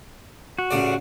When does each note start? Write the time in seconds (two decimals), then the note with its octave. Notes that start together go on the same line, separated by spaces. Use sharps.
0.59 F#4
0.71 A1 C#3 D5